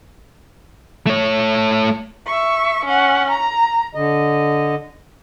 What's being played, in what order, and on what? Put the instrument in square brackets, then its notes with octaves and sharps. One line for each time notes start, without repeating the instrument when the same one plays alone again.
[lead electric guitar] A3 C#5
[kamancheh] E5 C#6
C#4 F#5
A#5
[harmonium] D3 D#5